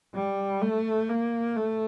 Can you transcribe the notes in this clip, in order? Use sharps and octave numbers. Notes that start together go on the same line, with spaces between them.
G3
A3
A#3
A3